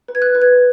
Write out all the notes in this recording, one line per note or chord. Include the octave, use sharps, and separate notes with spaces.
B4
G#6
F#6
B4
G#6